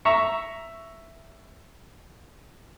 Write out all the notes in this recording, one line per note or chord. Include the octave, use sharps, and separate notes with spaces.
E5 A#5 C#6